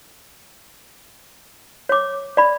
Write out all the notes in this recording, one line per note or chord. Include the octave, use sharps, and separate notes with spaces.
C#5 D6
D5 B5